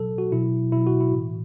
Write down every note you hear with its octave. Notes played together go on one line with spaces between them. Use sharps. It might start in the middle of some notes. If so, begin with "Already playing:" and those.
Already playing: B2 F#3 A4
F#4
B2 F#3 E4
B2 F#3 E4
F#4
E4
A2 E3